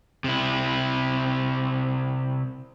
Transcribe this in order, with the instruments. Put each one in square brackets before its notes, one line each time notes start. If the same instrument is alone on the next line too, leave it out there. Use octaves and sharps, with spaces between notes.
[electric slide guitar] C3 E4